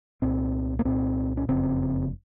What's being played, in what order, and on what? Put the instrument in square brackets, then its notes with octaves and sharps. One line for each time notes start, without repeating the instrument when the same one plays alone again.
[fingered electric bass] C2 A#2 C4
A#3
C2 A#2 C4
C#4
F#1 F2 C#3 C4